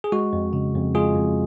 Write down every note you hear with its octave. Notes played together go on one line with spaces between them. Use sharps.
G#4
G#3 F#4
F2
C#3
F2
G#3 F4 G#4
F2